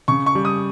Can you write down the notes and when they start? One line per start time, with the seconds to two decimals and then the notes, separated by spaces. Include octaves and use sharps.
0.08 C#3 C#6
0.26 C#6
0.35 G3
0.45 D#6